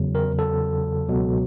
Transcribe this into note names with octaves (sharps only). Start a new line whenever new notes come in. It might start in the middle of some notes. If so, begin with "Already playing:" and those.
Already playing: E2 C#3 F#3
A#4
A4
C#2 B2 F#3